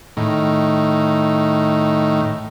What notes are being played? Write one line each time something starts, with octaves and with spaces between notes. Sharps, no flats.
A2 D#3